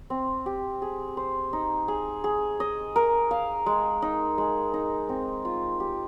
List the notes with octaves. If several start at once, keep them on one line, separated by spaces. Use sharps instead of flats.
C4
G4
G#4
C5
D#4
G#4
G#4
D#5
A#4
F5
G#3
D#4
G#3
D#4
C4
F4
G4